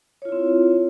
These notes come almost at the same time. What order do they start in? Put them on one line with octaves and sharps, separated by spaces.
C#5 F4 E4 C4